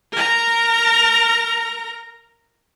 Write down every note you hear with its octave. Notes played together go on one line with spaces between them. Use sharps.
A#4 A#5